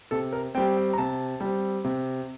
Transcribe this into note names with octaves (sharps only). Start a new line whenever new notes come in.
C3 A4
A#4
G3 C4 G5
G5
A#5
C3 A5
G3 C4
C3